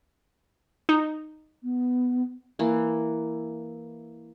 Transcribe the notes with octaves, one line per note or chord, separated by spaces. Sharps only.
D#4
B3
E3 A#3